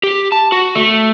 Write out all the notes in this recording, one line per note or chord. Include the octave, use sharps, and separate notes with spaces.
G4
A5
F#4
A3